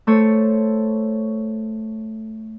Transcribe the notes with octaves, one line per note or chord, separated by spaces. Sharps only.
A3 A4 C5 C#5